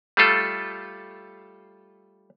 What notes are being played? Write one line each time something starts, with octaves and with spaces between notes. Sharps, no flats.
G3 A3 F4 A4